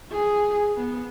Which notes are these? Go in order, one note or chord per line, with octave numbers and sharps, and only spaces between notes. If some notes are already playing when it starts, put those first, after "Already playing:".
G#4
B3